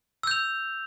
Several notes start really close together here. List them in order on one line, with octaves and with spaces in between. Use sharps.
E6 G6 F7